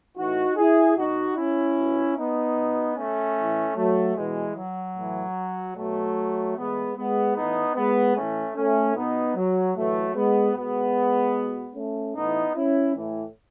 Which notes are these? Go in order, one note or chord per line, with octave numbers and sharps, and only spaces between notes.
A2 E3 D#4 F#4
E4 G#4
B2 D#4 F#4
C#4 E4
B2
B3 D#4
B2
A3 C#4
A2 E3
F#3 A3
B2 E3 G#3
F#3
A2 E3
B2 F#3 A3
A2 E3 G#3 B3
G#3 B3
A2 E3 B3 D#4
G#3 B3
A2 E3 A3 C#4
A3 C#4
B2 B3 D#4
F#3
A2 E3 F#3 A3
G#3 B3
B2 G#3 B3
B2
A3 C#4
A2 E3 B3 D#4
C#4 E4
A2 E3